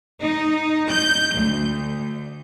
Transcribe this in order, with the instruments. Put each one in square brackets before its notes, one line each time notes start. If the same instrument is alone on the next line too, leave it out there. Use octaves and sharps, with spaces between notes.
[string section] D#4
G6
D2